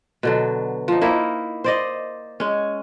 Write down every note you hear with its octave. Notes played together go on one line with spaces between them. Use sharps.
B2 D3 F#3
F3 D#4
A#3 D#4 E4
C5 D5 D#5
G#3 C#4